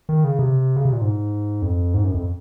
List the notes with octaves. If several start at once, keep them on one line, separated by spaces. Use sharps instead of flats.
D#3
C#3
C3
C#3
C3
A#2
G#2
F2
G#2
F#2
F2